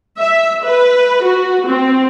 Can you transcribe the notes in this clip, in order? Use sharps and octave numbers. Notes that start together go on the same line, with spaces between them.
E5
B4
F#4
C4